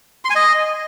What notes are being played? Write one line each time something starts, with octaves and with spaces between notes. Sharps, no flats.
C6
G#5
D#5